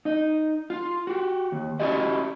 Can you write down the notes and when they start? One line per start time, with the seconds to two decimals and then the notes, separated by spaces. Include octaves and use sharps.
0.05 D#4 D#5
0.70 F4
1.07 F#4 G4
1.52 D#2
1.80 C#4 E4 F#4 G4 D5 D#5